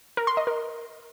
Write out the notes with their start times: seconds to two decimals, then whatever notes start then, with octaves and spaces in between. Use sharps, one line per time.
0.17 A#4
0.27 C6
0.37 D#5
0.47 A#4